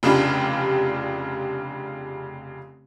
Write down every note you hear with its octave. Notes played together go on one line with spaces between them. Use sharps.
F1 C#3 D4 F4 G4 B5